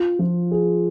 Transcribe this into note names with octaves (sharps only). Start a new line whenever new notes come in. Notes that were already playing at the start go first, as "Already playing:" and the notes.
Already playing: F4
F3
G#4